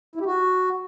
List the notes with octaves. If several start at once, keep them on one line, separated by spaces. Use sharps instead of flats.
E4
G4
F#4